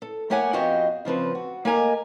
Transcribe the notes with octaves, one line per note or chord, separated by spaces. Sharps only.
A4
A3 A#3 G4 C#5 F#5 G#5
F2 B3 F#4 G4 D#5 F5
C#3 F3 C4 B4
F#4
A#3 G4 A#4 D#5 G#5 A#5